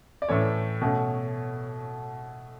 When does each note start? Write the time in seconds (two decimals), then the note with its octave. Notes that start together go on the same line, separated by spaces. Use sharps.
0.22 D5
0.29 A2 E3 A3 C#4 C#5
0.81 B2 A3 C#4